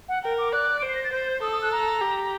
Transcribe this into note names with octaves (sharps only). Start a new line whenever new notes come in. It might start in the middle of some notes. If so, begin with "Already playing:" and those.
F#5
A#4 G5
D6
D5 F#6
D7
C5
C7
A#6
A6
C5 G6
G6
A4 D#6
D#6
F#6
A#5
G4